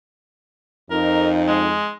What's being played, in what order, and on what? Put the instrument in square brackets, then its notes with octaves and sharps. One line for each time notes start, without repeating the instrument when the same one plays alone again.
[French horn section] F2 D#4 [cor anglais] A#4
[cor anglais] G#3